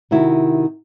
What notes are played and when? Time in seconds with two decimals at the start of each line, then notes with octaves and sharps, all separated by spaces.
0.11 C3 D#3 E4 F#4